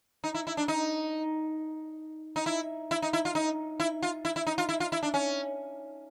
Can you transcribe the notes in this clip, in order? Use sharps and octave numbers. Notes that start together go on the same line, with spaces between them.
D#4
E4
E4
D4
D#4
D#4
E4
E4
D#4
E4
F4
D#4
E4
F4
E4
E4
D#4
F4
E4
F4
E4
D4
C#4